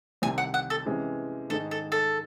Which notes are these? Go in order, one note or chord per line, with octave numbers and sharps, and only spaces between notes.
C2 C3 D#3 G#5
F#5
F#5
A4
C3 E3 G#3 C#4
G#2 D#3 G#3 D#4 A4
A4
A4